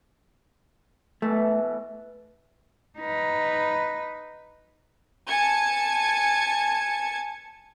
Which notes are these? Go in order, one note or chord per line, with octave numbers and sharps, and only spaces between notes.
B2 E3 A3
D#4 B4
G#5 A5 G#6 C#7